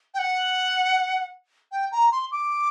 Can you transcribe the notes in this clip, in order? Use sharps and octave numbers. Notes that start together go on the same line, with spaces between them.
G5
F#5
G5
A#5
C6
D6